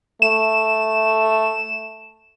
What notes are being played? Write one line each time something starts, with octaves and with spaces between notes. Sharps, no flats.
A3 E7